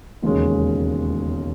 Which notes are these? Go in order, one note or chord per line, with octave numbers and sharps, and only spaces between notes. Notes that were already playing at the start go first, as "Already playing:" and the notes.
E1 D#2 C#3 G#3 C#4